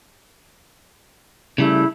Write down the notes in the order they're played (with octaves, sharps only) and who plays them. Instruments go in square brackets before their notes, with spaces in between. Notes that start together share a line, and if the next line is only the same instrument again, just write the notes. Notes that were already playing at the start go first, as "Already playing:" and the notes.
[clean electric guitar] C#3 G3 A3 [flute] E4